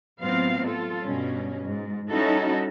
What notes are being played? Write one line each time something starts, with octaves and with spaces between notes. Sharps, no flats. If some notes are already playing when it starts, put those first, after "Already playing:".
A2 F#3 B3 C4 F4 F5
F4 A4
G2 B2 C#4
G#2
G3 C#4 D#4 E4 F#4 A4